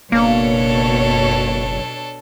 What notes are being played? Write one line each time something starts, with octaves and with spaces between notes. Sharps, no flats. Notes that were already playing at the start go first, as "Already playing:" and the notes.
F#1 B2 A#3 D4 A4 C#5